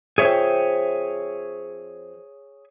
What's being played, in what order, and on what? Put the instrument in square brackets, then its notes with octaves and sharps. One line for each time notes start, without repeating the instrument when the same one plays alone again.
[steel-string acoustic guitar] F2 C5 G5 [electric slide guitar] G#4 C#5 E5